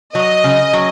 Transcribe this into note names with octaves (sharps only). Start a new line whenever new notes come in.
F#3 D#5
C#3
F#3